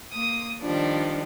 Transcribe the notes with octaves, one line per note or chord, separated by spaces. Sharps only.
A#3 D#6
D#3 F3 G3 D4